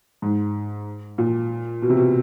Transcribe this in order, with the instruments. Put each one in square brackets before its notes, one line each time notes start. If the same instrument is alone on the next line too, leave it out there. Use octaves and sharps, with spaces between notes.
[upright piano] G#2
A#2
B2
C3
B2